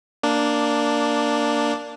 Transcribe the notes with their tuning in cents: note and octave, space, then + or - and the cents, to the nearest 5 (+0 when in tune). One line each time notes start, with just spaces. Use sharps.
A#3 -5 D4 +0